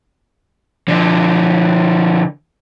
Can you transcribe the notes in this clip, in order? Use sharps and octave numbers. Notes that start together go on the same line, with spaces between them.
D3 F3